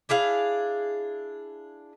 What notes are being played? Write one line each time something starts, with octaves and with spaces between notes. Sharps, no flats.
D4 E4 G#4 F5